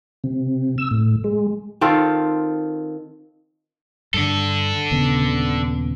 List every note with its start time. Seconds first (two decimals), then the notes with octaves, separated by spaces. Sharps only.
0.24 C3
0.78 E6
0.91 A2
1.24 G#3
1.81 D#3 C4 F4 A4
4.14 G2 D3 D4 A4
4.91 D#1 C#3 B3